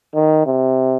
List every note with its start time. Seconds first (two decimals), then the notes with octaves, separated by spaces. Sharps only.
0.15 D#3
0.46 C3